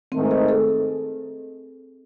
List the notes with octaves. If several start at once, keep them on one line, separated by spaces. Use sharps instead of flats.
G#2 D#3 A3 C4
G#4
A4